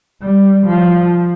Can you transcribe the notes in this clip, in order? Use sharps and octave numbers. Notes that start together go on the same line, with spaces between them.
G3
F3